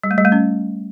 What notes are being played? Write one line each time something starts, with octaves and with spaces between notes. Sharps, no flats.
G3
A3
G3
A3
C#4